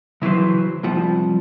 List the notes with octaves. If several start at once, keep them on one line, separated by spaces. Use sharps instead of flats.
C#3 E3 F#3 B4 C5
C2 F2 F3 G3